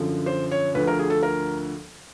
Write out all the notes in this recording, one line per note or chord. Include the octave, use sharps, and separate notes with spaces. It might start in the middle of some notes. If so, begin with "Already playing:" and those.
Already playing: F#2 D3 F3
C5
C#5
D2 D3 F3 B4
A#4
G#4
A4
A#4